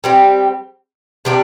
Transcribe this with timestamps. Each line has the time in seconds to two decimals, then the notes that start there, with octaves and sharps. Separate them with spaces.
0.04 G3 C4 G4
1.25 C3 G3 D4 G4